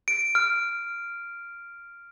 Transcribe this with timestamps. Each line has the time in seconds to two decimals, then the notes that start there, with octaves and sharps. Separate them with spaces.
0.08 D7
0.35 F6